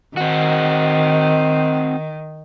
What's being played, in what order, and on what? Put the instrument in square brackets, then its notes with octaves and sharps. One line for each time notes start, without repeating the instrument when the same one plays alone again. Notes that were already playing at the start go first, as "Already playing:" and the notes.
[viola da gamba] D#3 [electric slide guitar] C4 F#4